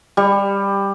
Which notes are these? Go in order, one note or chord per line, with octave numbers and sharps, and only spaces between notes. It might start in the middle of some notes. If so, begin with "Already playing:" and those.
G3